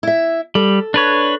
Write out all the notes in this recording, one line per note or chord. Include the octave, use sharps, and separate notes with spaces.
E4 E5
G3 A4
D4 B4 C#5